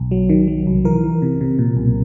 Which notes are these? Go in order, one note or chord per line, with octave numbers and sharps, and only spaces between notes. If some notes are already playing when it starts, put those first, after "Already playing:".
Already playing: B1
F#3
D#3
F#3
C2
E3 A#4
E3
C3
C3
A#2
B1